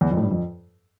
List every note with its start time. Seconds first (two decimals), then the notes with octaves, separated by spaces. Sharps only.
0.01 E2
0.11 F2
0.17 A2
0.21 G2
0.31 F2